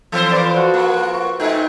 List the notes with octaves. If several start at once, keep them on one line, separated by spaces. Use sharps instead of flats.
E3 C4 F4 A4 C5
F3 B4 D5
F#4
A#3
F#4
A#2 A3 D#4 G5 G#5